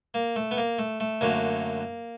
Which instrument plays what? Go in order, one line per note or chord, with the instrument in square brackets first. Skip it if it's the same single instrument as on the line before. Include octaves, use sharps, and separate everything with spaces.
[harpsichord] A#3
A3
B3
A#3
A3
A3
F#2 D3 F#3 A3 A#3